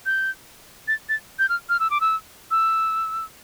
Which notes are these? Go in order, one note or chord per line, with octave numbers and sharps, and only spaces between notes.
G6
A6
A6
G6
F6
F6
E6
D6
E6
E6